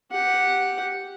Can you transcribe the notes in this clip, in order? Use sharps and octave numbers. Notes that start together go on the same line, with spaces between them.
G4 F#5